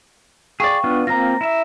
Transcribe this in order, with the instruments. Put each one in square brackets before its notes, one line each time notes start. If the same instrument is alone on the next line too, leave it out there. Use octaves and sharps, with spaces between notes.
[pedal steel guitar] G#4 D5 [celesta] F5 G5 C#6
[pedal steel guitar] B3 D4 F4
[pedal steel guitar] A#3 C4 F4 [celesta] A#5 A#6
[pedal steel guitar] E4 E5